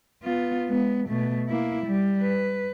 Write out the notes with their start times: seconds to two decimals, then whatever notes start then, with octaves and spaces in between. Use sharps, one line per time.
0.23 B3 F4
0.69 G#3 B3
1.09 B2 A3
1.48 A#3 E4
1.86 G3
2.21 B4